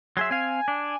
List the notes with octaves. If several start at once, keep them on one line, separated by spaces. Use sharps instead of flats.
F#3 G#4 E5 C6
C4 F5 G#5
D4